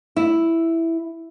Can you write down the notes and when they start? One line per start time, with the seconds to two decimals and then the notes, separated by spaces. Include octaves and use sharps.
0.16 E4